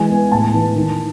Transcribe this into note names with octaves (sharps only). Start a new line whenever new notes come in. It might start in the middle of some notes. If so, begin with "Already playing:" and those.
Already playing: E3 G#3 G#5
B3
A2 A5
E3
D#3